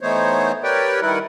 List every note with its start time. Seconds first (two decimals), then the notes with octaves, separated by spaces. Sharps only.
0.01 E3 A3 B3 D#4 C5 C#5
0.63 G4 A#4 B4 C#5 D5 G5
1.02 D#3 G3 E4 A#4 B4 F#5